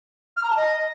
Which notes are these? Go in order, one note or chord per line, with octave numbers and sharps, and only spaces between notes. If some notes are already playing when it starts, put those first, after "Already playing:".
F6
A#5
A5
D#5